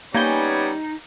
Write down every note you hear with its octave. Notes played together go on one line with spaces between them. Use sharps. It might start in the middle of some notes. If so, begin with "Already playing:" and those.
G3 A#3 B3 C#4 D#4 C#5 G#5 G6